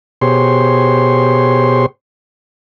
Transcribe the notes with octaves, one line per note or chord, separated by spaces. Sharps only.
B2 G4 G#4 C5 C#5 C6